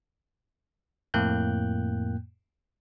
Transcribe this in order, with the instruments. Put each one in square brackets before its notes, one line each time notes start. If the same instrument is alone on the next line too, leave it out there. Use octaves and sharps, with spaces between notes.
[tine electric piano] F2 A2 A#3 G5 F#6 G6